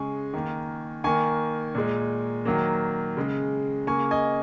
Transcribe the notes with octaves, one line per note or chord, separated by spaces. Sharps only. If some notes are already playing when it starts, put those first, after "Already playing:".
Already playing: C#3 G#3 G#5 C#6
D#3 A#3
D#3 A#3 G#5 C#6
A#2 G#3
D#3 F#3 A#3
C#3 G#3
C#3 A#3 G#5 C#6
D#5 G#5